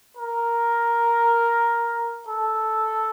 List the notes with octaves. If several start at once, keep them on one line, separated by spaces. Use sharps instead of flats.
A#4
A4